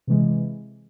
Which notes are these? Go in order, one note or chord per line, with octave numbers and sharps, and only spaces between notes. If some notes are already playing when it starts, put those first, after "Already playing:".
C3 E3 G#3